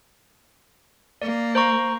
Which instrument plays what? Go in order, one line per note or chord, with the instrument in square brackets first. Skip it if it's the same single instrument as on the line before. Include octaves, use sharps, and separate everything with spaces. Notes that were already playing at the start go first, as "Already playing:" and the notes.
[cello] A#3 [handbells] D5
[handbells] C5 A#5 C#6